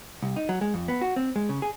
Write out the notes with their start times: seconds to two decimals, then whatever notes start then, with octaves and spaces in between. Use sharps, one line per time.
0.22 C2
0.36 D#4
0.49 F#3
0.61 G#3
0.74 F2
0.88 B3
1.01 F#4
1.16 C4
1.36 G#3
1.49 C#3
1.62 G#4